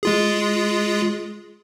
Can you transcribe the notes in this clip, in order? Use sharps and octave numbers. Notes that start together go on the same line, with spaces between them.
G#3 F4 G#4